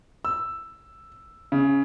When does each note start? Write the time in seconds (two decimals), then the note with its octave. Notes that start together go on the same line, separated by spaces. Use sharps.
0.25 E6
1.52 C#3